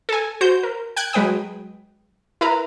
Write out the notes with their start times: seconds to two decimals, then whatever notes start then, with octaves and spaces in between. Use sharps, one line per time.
0.09 A4 G#5
0.41 F#4 C5 G6
0.63 A#4
0.96 G5 F#6 G#6
1.13 F#3 G#3 B4 G5 D#6
2.41 E4 A#4 B4 A#5